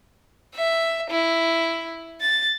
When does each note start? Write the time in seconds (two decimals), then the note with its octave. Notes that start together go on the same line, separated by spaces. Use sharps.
0.56 E5
1.11 E4
2.21 A6